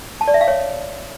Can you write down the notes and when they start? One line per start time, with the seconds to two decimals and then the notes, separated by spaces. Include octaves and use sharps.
0.21 A5
0.28 D5
0.34 E5
0.41 F5
0.48 C#5